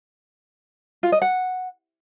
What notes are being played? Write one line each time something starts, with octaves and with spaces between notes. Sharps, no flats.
F4
D#5
F#5